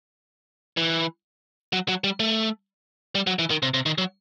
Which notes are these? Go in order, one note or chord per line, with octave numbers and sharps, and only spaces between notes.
E3
F#3
F#3
G3
A3
G3
F#3
E3
D#3
C3
C3
D#3
F#3